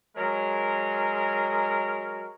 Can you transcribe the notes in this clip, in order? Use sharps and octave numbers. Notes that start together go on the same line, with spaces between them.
F#3 G#3 A#4